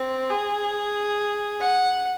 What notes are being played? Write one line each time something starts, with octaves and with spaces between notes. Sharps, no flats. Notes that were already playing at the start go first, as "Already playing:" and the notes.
Already playing: C4
G#4
F#5